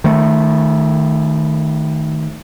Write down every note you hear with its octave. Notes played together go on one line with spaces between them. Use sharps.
D#3 A3